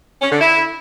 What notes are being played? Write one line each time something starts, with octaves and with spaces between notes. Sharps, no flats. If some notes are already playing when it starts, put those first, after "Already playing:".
C#4
D3
E4